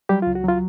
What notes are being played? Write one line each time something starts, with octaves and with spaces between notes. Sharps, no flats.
F#3 G3 G4
F4
C#2
F#4
F#3 F4